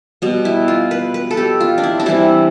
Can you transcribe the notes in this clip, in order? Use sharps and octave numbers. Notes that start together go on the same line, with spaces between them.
B2 G3 B3
E4
F4
B4
B4
A4
G4
F4
D4
E4
D4
C3 E3 G3 E4